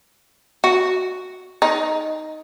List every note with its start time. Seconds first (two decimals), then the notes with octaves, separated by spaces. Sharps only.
0.64 F#4
1.62 D#4